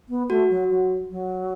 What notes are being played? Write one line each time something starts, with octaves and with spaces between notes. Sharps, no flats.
B3
A3 F#4
F#3
F#3
F#3